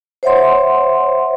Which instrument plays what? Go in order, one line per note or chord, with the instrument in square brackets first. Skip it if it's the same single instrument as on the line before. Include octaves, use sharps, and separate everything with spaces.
[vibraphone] C5 C#5 E5 F#5 C6